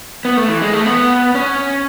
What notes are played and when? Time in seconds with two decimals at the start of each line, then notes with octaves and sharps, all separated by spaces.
0.25 B3
0.37 A3
0.49 E3
0.61 G#3
0.73 A3
0.86 B3
1.35 C#4